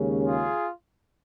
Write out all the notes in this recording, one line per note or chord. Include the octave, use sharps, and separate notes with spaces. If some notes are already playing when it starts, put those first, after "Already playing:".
Already playing: D#2 C#3 G#3 C#4
F4 G#4